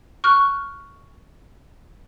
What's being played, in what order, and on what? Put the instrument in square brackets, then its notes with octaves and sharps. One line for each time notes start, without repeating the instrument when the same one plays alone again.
[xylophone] C#6 F6 F#6